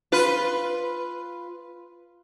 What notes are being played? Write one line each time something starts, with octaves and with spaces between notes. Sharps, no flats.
F4 B4